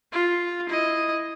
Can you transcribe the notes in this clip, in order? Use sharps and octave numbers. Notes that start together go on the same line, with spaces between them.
F4
E4 D#5